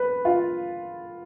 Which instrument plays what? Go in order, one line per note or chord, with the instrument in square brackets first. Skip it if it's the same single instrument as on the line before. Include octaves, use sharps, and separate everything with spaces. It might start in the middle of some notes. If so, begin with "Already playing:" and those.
Already playing: [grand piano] B4
F4